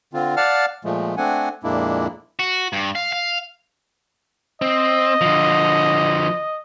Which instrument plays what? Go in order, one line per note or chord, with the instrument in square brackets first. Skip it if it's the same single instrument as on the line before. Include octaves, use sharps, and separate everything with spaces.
[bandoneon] D3 C4 F4
D5 F5 F#5 A5 F6
A#2 F3 G#3 A3
A3 C4 D4 F#5 G#5
F2 A#2 G#3 A#3 D4 E4
[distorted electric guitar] F#4
G2
F5
F5
[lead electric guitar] C4 [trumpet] D#5
[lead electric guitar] D3 F3